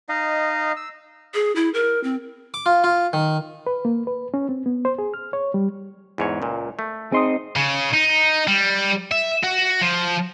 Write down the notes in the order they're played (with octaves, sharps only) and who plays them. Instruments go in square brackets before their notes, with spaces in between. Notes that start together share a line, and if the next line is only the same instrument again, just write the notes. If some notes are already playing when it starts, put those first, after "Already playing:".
[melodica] D#4 D#5 F5
E6
[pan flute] G#4
E4
A#4
C4
[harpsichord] D6
F4
F4
D#3
[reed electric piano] B4
A#3
B4
C#4
C4
B3
C5
G#4
F6
C#5
G3
[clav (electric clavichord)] E2 G#2 C#5
C#2 A#2
A3
[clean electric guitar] C4 D#4 [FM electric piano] G#4 C6 D#6
[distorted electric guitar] C#3
D#4
G3
E5
F#4
F3